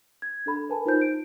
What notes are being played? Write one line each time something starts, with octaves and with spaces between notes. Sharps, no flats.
G#6
D4 A4 B5
A#4 B4 G#5 A5
D#4 F4 C5 G6
D7